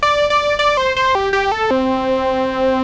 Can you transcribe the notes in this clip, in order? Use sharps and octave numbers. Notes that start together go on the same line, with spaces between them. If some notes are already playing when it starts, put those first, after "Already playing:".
D5
D5
D5
C5
C5
G4
G4
A4
C4